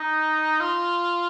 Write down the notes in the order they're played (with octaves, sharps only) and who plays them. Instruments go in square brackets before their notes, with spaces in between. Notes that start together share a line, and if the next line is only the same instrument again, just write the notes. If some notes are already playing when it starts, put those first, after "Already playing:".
Already playing: [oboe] D#4
F4